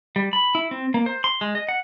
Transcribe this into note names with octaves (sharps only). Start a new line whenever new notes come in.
G3
B5
E4
C4
A#3
C5
C6
G#3
D#5
F#5